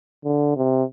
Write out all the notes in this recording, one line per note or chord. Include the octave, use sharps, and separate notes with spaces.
D3
C3